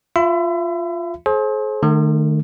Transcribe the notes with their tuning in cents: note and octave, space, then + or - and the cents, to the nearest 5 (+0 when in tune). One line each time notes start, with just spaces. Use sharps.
F4 +0 E5 +30 B5 +35
G#4 +45 C5 +30
D#3 -35 A3 +0